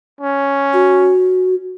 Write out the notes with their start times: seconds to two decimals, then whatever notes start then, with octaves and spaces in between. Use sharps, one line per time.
0.21 C#4
0.73 F#4